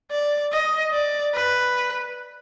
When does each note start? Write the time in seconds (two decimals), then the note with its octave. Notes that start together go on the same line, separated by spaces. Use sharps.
0.11 D5
0.53 D#5
0.94 D5
1.35 B4